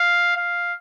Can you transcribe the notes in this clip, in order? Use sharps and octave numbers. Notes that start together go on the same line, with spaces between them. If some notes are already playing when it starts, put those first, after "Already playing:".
Already playing: F5
F5